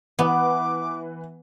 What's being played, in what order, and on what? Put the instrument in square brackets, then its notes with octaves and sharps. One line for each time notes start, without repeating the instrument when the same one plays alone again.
[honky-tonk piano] E3 B4 [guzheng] B3 [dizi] D6